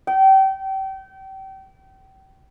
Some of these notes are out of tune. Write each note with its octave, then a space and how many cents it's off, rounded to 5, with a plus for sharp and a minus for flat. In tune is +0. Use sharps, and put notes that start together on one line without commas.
G5 -30